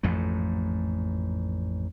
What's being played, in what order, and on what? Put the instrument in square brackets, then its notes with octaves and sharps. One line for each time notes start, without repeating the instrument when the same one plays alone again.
[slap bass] A1 F2 G#2 A3